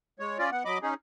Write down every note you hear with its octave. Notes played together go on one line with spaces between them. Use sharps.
G#3 C#5
C#4 F4 D5
B3 F#5
F#3 D#5 B5 D6
C#4 D#4 G#4